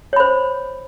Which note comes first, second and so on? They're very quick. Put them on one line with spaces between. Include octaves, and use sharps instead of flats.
C#5 B5 C5